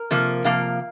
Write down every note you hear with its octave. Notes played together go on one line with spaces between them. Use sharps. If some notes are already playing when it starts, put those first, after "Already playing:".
Already playing: A#4
C3 F3 A#3
C3 F3 A#3 F5